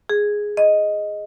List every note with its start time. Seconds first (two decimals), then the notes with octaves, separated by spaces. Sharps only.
0.10 G#4
0.57 D#5